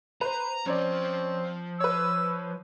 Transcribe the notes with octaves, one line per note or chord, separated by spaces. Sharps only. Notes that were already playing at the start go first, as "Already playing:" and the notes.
B4 C5 A#5
F3 C4 C#4 C#5 D5
B4 C#5 E6